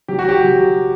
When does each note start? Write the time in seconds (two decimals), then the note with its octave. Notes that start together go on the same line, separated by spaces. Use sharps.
0.08 F#3 G4
0.19 F#4
0.29 G4
0.44 F#3